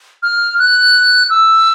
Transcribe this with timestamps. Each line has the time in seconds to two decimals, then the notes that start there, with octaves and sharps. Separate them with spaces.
0.23 F6
0.59 F#6
1.30 E6